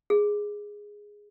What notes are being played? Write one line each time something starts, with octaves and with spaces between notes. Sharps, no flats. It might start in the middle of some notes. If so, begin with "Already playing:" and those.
G#4